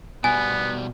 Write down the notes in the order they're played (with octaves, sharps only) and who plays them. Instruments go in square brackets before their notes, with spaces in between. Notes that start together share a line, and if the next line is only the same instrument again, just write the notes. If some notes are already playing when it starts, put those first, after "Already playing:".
[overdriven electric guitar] B2 G3 [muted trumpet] B3 [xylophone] G#5